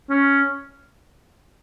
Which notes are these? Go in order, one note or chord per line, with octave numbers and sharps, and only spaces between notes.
C#4